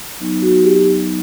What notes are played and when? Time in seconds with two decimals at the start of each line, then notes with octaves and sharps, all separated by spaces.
0.20 F#3 B3 D#4
0.42 F#4
0.65 G4